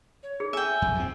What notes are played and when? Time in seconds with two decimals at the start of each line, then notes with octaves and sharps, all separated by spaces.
0.23 C#5
0.40 G#4
0.53 E5 G5 G#5
0.82 F2
0.95 F3 C4